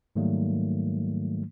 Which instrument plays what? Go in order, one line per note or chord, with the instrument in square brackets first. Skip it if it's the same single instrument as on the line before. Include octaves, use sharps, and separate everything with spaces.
[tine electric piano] G#2 D#3 F#3 G3 A3 A#3